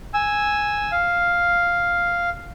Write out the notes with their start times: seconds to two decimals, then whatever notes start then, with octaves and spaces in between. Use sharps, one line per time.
0.14 G#5 E6
0.92 F5